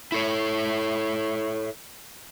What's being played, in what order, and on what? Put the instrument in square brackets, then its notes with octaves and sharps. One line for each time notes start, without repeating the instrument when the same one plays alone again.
[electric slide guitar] E4 A4 C#5